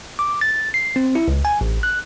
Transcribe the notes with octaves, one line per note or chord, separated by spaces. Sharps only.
D6
A6
C7
C4
E4
C#2
G#5
A1
F#6